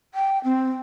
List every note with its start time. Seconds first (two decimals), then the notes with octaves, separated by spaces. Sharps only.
0.14 G5
0.44 C4